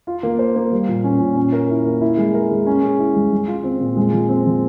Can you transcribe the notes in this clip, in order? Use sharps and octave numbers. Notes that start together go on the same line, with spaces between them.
F4
A#3
C5
A#3
G3
A#2
C#4
A#2
C#4
A#4
E4
A#3
E4
G#3
A#4
G#3
C#4
G#4
E4
G#3
G#3
F4
C4
A#2
G#3
F3
C4
F3